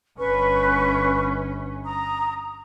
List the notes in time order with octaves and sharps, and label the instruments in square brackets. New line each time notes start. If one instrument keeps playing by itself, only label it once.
[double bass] G1 C#4 [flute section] B4 C#6
[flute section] A#5 D#6